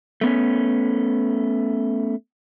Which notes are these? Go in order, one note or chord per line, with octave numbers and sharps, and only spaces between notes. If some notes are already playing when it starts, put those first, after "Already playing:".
A3 B3 C#4